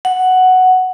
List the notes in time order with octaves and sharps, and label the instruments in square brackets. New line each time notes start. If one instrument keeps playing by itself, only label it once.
[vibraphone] F#5